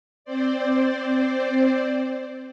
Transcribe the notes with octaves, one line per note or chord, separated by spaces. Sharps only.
C4 C5 D5